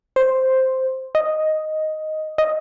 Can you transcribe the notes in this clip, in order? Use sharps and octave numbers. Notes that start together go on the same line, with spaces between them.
C5
D#5
D#5